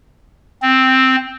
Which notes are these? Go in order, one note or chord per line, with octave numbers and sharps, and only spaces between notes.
C4